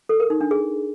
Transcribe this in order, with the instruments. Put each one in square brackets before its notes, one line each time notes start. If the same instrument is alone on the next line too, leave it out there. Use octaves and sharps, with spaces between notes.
[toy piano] A4
A#4
D#4
D4
G#4